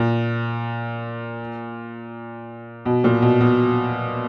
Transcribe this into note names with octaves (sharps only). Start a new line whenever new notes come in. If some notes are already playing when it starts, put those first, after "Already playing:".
Already playing: A#2
B2
A#2
B2
B2